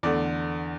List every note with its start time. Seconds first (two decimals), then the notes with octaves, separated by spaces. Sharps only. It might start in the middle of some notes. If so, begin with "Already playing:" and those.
0.03 E2 D3 A3 D5